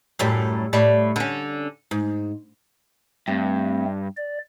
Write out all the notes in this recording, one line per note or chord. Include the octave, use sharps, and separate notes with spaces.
F#2 A2 G3
A2 G3 D5
D3 C#4
G#2
G2 A3 C4
D5